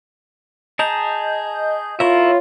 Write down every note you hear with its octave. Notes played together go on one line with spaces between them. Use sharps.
G#4 D#5 A5 A#5 G6
E4 F4 A#4 C#5 E5